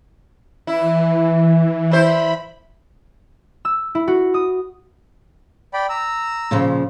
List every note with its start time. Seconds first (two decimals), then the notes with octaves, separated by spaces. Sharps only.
0.67 E3 E4
1.91 E4 C5 B5
3.65 E6
3.95 E4
4.08 F#4
4.34 D#6
5.74 D5 G5 B5
5.89 A#5 E6
6.51 A#2 C#3 F3